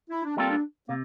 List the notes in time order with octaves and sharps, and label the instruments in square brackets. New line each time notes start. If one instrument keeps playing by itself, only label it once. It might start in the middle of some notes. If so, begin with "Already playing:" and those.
[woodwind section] E4
D4
[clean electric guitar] G3 A#3 F4 A4 [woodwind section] C4
[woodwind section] D4
[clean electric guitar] C3 [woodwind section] A#3